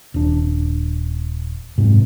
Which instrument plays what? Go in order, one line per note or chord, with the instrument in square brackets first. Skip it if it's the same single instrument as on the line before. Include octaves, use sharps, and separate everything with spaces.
[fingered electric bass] D#1 D4
F#1 G#2 C3